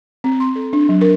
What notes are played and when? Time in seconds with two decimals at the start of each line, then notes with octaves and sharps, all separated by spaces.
0.24 C4
0.40 C6
0.56 A4
0.73 D4
0.89 F#3
1.01 A#4